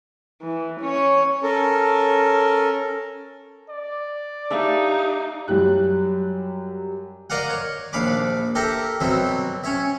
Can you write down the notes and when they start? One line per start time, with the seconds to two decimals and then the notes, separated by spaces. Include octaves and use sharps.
0.42 E3
0.81 C#4 C#5
1.43 C#4 A4 A#4
3.69 D5
4.50 D4 D#4 G4 E5 F5
5.48 F#2 F#3 G3 G4 F#6
7.30 A#4 D5 D#5 F5 F#5
7.50 C#5
7.93 A#1 D#2 F5 B5 D6
8.55 G4 A4 A#4 E5
9.00 B2 F#3 G3 C4 E5
9.64 C#4 C#5 E5